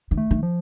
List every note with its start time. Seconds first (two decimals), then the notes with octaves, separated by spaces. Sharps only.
0.11 D#3
0.17 A3
0.31 D#3
0.43 F3